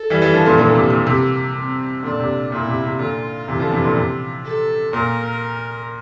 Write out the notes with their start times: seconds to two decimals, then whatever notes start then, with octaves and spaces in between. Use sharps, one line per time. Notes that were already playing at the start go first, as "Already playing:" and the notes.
Already playing: A4
0.10 E3 G3
0.22 E3 G3
0.34 D3 F3
0.46 A#2 D3
0.58 A#2 D3 A#3
0.74 C3
0.90 A#2
1.06 C3 A#3
1.55 C4
2.03 A#2 D3 D4
2.20 C3
2.51 A#2 E4
2.67 C3
2.84 C3
2.99 A#2 D3 F4
3.48 C3 E3
3.60 D3 F3
3.72 C3 E3
3.84 A#2 D3
3.96 C3
4.44 A4
4.93 A#2 A#4